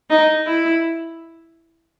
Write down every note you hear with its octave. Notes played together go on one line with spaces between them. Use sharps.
D#4
E4